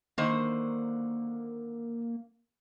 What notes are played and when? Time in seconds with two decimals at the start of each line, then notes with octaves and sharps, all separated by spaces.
0.18 D3 D#3 A#3 C5